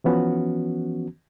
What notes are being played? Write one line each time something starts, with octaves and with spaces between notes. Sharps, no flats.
E3 F3 B3 C#4 F#4